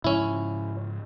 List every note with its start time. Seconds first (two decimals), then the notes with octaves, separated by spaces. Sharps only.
0.04 G#2 C#3 F3 C#4 E4